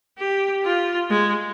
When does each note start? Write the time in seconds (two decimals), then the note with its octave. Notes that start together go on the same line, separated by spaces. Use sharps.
0.18 G4
0.64 F4
1.10 G#3